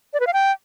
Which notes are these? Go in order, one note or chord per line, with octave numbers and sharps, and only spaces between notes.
D5
B4
F5
G5